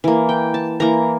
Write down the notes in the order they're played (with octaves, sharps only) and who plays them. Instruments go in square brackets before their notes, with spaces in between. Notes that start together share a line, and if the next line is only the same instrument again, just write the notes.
[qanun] E3 A#3
G5
A5
E3 A#3 A#5